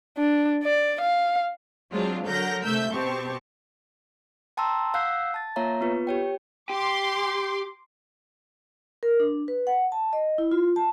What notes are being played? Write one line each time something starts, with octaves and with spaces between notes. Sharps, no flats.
D4
D5
F5
F#3 G#3 C4 D4 F4
D3 F#3 A#4 F#5 G6 A#6
C3 A3 E5 E6 G6
B2 C4 G4 A5 C#6
G5 A5 A#5 C6 E6
F5 F#5 E6 F#6 G6 C7
A5 A6
A#3 F4 C#5 E5 F5 A#5
B3 F4 B4
G4 C#5 G5
G4 C6 D6
A#4
D4
B4
F#5
A5
D#5
E4
F4
A5